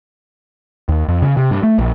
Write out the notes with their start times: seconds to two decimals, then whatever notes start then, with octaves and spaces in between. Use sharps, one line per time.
0.89 D#2
1.08 F2
1.22 C#3
1.37 C3
1.51 G2
1.63 A3
1.78 A#1